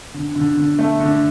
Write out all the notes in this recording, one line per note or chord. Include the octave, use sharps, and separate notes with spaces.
D3
D3
D3
A3
D3